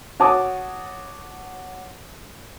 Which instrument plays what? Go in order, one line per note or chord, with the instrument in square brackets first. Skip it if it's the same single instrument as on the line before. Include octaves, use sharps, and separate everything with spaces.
[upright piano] F#4 C#5 A5 D6 D#6